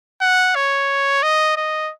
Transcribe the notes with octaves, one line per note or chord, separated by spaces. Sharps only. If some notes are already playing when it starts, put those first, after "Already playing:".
F#5
C#5
D#5
D#5